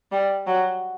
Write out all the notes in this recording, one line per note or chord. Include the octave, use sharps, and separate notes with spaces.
G3
F#3